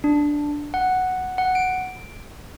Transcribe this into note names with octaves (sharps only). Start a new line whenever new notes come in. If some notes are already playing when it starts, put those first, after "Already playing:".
D4
F#5
F#5
D7